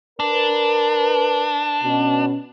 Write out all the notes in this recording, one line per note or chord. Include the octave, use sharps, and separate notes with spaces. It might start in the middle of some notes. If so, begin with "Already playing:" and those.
D4 A#4 B4
B2 C#4